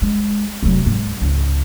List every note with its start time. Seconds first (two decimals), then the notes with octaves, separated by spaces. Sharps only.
0.02 G#3
0.63 F1 F#3
0.86 G#2
1.21 C#2